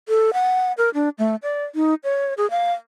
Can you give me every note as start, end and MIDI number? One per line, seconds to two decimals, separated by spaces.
0.08 0.31 69
0.33 0.72 78
0.78 0.90 70
0.94 1.09 62
1.18 1.36 57
1.43 1.64 74
1.75 1.94 63
2.04 2.34 73
2.38 2.49 68
2.51 2.72 77